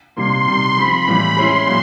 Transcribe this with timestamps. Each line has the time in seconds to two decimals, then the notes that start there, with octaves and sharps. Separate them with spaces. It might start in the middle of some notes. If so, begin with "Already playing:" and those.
0.16 C3 D#3 G3 A#3 C6
0.47 C3 D#3 G3 C6
0.77 F3 G#3 C4 B5
1.07 A2 E3 G3 A#3
1.37 G#3 C#4 E4 C6
1.67 A#2 F#3